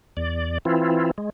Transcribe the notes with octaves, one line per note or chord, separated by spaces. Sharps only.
E2 D5
E3 C4 E4 F4
G#3